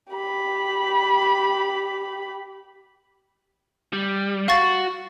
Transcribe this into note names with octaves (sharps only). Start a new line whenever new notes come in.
G4 B5
G3
F#4 F5 C#6 A6